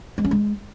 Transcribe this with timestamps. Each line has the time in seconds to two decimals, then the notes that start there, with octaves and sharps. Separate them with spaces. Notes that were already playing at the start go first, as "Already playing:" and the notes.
0.18 G#3
0.25 C#4
0.31 G#3